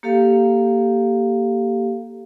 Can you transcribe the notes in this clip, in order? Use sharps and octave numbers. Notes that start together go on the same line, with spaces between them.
A#3 G4 A4 F5